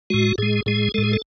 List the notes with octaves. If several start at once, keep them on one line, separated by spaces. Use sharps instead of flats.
A2 G#3 F#4
A2 G#3 G#4
A2 G#3 G#4
A2 G#3 A4
G#4
A4